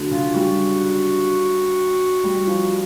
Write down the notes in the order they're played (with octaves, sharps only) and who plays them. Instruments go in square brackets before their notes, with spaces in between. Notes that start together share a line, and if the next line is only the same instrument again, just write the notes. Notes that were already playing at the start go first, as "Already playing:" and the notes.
Already playing: [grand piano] D3 F#3
[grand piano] C#3 [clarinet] F4
[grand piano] G3 [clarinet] F#4
[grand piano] G3
F3